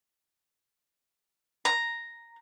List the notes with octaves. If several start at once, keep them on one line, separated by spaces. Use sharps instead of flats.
A#5